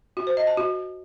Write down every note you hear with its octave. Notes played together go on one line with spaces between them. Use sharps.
F#4
C5
D#5
A5
F#4